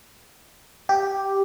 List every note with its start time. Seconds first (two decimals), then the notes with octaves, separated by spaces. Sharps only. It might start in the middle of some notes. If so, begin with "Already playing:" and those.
0.89 G4